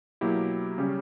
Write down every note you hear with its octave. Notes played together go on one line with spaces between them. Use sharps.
B2 F#3 A#3 E4 G4
C#3 G3 C#4 G4